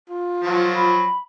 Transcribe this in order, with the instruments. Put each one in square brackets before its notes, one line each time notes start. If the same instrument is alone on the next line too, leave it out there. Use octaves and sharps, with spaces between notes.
[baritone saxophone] F4
[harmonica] F3 F#3
[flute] B5